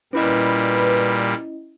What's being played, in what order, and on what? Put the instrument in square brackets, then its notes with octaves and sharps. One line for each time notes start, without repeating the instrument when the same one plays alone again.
[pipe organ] A#2 G3 [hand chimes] C#4 E4 D#5 [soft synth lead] B4